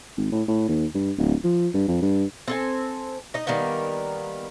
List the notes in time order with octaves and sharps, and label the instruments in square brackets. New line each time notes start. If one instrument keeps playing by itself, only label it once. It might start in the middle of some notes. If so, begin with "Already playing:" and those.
[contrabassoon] G#1
A2
A2
D#2
G2
D1
F3
G2
F2
G2
[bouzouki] C4 A4 G#5
D#4 D#5
D#3 G3 A#3 B3